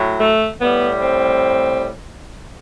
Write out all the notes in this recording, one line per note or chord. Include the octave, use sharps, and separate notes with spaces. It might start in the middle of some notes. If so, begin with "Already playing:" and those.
Already playing: A2 F#3
A3
A2 G3 B3
C4